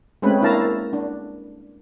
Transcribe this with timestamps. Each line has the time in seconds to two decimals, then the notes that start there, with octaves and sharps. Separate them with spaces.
0.22 G#3 A3 C4 C#4 B4
0.41 A#3 D4 E4 F5 A5 A#5
0.93 D4